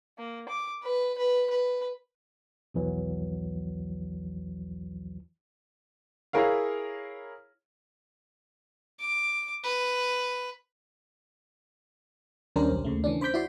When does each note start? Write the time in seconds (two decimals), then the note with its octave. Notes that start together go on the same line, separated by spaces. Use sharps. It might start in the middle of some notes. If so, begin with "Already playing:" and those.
0.18 A#3
0.49 D6
0.83 B4
1.18 B4
1.50 B4
2.74 B1 E2 E3 F#3
6.33 E4 G#4 A#4 C#5 F5
8.99 D6
9.63 B4
12.56 D#2 G3 C#4 D4 A#4 C5
12.69 B1
12.85 D#2 C#3 A3
13.04 E3 C#4 D4
13.21 C5 B5 D6 G6 B6
13.34 E4 F#4 D5 C6